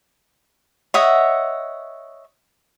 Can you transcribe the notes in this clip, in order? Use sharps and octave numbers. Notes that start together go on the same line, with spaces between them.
C#5 D#5 E5 F#5